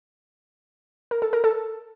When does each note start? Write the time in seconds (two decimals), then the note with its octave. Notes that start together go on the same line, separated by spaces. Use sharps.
1.11 A#4
1.22 A4
1.33 A#4
1.44 A4